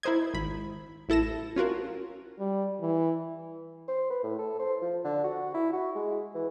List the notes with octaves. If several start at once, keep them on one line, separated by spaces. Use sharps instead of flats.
E4 A#4 C5 D#5 G#6
G#1 B5
A1 E4 A4 A#6 E7
C#4 F4 F#4 A#4
G3
E3
C5
B4
A2
A4
C5
F3
D3
F#4
E4
F#4
G#3
E3